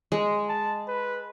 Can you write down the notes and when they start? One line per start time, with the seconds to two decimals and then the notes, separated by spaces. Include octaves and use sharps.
0.12 G#3
0.49 A5
0.88 B4